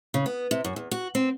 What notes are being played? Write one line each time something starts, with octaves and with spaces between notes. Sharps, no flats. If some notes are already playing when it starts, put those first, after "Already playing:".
C#3
B3
C3
F#2
E2
F#4
C4